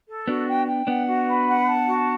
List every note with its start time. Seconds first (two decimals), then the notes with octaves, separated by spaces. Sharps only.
0.09 A4
0.28 B3 D4 F#4
0.47 G5
0.67 G5
0.87 B3 D4 F#5
1.07 F#4
1.27 B4
1.47 F#5
1.67 A5
1.87 F#4